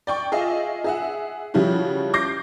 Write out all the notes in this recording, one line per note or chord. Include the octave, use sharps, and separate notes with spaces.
D5 G5 C#6
F4 G#4 D#5 E5
G#4 E5 F#5
C#3 F3 G3 E4 F#4
D6 G6 A#6 C7